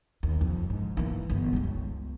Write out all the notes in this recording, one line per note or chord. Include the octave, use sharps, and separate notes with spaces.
D#2
F2
G#2
E3 A#3
G1 B3
C#2 G3